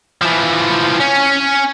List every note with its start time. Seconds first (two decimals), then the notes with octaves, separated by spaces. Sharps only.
0.21 E3 F3
1.00 C#4